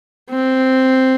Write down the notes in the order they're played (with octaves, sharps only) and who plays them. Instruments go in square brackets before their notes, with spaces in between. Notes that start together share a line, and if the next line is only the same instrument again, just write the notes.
[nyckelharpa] C4